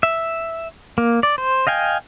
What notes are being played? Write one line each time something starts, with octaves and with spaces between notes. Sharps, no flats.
E5
A#3
D5
C5
D#5 F5 G5 G#5